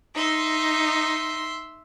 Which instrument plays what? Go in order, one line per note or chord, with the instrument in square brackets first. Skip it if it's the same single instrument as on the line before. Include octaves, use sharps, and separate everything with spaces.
[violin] D#4 [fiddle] E5 C6